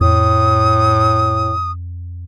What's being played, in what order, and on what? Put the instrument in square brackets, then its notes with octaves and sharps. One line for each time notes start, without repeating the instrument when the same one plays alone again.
[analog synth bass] F2 [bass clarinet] A2 [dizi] D#6